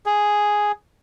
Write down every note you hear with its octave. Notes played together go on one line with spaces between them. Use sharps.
G#4